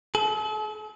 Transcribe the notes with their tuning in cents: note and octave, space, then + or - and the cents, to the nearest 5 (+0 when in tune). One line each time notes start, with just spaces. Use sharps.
A4 -45